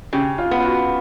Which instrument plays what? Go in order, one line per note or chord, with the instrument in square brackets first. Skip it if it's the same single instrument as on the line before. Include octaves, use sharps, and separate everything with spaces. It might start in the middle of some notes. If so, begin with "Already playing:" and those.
[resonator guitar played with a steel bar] C#3 [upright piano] G4
[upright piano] F4
[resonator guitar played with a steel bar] B3
[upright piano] F4
F#4